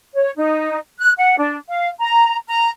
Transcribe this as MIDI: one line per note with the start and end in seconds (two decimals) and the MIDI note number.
0.15 0.31 73
0.38 0.78 63
0.99 1.11 90
1.17 1.37 78
1.37 1.56 62
1.68 1.88 77
2.00 2.37 82
2.48 2.70 82